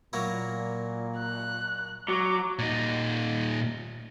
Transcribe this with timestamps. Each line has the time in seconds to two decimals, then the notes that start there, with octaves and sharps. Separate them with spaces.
0.13 A#2 F#3 A#3 E4
1.18 F#6
2.08 F#3 D6
2.59 A#2 D#4